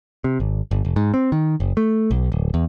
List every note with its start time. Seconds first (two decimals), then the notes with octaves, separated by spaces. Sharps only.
0.24 C3
0.40 G#1
0.71 G1
0.85 F1
0.96 G#2
1.14 C4
1.32 D#3
1.60 F#1
1.77 A3
2.11 B1
2.32 D1
2.54 E2